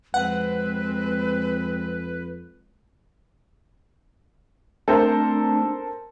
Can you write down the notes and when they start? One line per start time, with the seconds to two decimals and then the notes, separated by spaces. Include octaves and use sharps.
0.14 F2 G#3 C4 B4 F#5
4.88 A3 C4 D4 A4 A#4 C5